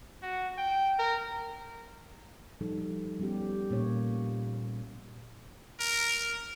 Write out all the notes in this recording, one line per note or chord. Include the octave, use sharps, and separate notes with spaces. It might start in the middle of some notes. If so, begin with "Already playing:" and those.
F#4
G5
A#4
F3 G3 D#4 A4
G3 B3 C#4 G4
A#2 A#3 C#4 C#5
A#4